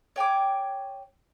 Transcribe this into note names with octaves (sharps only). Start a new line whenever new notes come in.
C#5 G5 G#5 D6